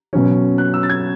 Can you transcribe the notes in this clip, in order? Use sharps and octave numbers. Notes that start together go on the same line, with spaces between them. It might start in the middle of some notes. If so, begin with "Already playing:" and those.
B2 F#3 C#4
F#6
E6
A6
G#6